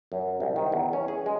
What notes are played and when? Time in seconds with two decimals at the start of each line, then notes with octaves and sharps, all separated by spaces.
0.12 F#2
0.40 C2
0.56 D#3
0.72 E2
0.93 C#4
1.08 G#4
1.26 G#3